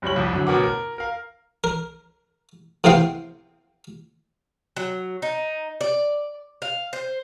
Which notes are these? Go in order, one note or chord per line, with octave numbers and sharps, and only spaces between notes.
F#1 G3 C#5 F#7
C2 F2
F#2 D3
A1 B2 A#4 F#5 D6
A#4
A#4 F5
A#4
A2 C3 B3 C5 F5 G5
F#3
D#4
D5
F5
C5